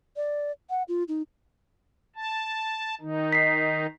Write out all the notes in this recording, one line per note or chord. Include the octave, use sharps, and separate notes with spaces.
D5
F#5
F4
D#4
A5
D#3 D#4
B6 C7